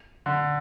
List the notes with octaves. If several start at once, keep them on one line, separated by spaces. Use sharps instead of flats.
D3